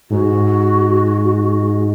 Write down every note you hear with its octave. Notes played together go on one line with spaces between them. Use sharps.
G#2 F#4